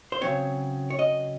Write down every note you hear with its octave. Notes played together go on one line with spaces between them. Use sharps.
C5
C#3 F#3 C4 C#5
C#5
D#5